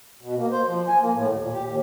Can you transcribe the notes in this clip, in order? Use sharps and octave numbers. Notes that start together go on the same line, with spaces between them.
B2
A#3
C5
F3
G#5
A#3
A2
D#2
A#2
G4
D#2